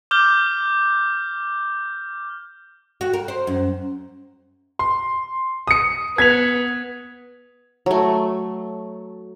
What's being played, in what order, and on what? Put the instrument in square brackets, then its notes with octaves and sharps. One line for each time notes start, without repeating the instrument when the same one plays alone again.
[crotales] D6 F6 G6 G7
[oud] F#4
A#4
C5
F#2
[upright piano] C6
D#6 C#7
[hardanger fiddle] B3 [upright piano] G#6 B6 F7
[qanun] F#3 A3